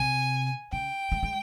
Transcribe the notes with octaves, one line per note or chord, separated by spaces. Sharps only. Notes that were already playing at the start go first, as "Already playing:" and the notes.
Already playing: C3 G#5
C#3 G5
G#3
G#3